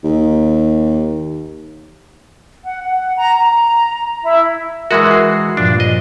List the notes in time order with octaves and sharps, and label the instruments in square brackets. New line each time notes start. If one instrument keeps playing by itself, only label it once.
[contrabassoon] D#2
[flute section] F#5
F#5
A#5
A#5
E4
[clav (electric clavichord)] E3 G#3 F#4 [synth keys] A#4 E5 D#6
[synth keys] C7
[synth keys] G2 A#2 F3 [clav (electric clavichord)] D4
[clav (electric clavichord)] D#5